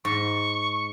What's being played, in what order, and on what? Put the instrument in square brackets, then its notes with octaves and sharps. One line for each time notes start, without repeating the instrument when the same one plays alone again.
[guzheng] G#2 [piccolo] C#6